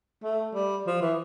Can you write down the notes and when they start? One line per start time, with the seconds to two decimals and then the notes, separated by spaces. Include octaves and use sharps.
0.23 A3
0.55 G3
0.87 F3
1.01 E3